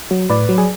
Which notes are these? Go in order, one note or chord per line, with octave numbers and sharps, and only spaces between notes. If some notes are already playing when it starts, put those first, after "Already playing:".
F#3
A2 B4 D5
F#3
G#4